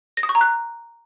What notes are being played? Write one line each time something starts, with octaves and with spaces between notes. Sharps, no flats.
A#6
D#6
C#6
A#5
F#6